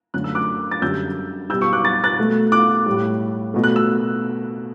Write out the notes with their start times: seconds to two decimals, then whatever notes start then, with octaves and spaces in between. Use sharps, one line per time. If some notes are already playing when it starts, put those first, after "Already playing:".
0.14 F#2 D3 A3 F#6
0.24 E6
0.35 D6 F#6
0.71 A6
0.82 F#2 D3 G3 E6 G6
1.50 B2 G3 E6 G6
1.61 C#6 E6
1.73 D6 F#6
1.85 A6
2.04 F#6 A6
2.19 B2 A3
2.52 D6 F#6
2.86 A2 G3
3.54 B2 A3
3.64 F#6
3.76 E6